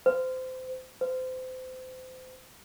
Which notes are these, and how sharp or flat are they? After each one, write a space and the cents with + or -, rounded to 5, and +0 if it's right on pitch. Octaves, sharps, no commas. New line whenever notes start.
C5 -25
C5 -30